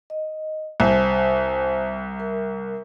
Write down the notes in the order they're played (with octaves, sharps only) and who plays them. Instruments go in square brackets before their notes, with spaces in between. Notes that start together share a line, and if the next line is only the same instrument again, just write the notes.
[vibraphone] D#5
[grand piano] C2 [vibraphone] C5 G#5 A5
[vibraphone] A#4